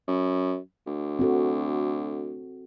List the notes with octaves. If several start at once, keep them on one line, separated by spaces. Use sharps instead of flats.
F#2
D2
C4 F#4 A4